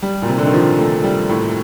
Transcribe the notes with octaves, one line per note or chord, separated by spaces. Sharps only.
G3
A#2
C3
D3
D#3
F3
A3
G3
A2